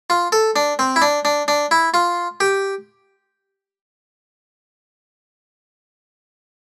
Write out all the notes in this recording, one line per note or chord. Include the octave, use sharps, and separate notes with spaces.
F4
A4
D4
C4
E4
D4
D4
D4
E4
F4
G4